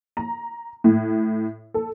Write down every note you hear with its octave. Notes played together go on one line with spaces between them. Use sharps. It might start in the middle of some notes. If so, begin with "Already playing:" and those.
A#5
A2
A4